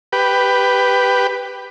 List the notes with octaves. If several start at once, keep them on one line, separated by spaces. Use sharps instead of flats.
G4 B4